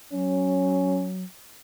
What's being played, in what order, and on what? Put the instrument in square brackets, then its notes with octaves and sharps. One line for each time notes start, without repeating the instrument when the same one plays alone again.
[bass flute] F#3 [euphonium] C#4